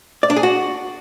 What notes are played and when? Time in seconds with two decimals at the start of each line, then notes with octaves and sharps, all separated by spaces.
0.23 D5
0.30 D4
0.36 G#4
0.43 F#4